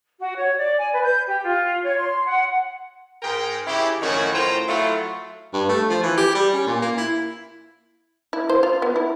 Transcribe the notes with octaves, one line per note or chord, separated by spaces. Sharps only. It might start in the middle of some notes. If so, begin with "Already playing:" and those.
F#4
C#5
D5
G#5
B4
G6
G4
F4
C#5
C6
F#5
G#2 A#4 G5
C#3 E4 G4
F#2 A2 D#3 F3 F#4 C#5
A2 F4 C5 G5 A#5
F#3 A3 E4 F4
G2
A3
F3
E3
G4
G3
C#4
A#2
A#3
E4
E4
C5
F4
B3
E4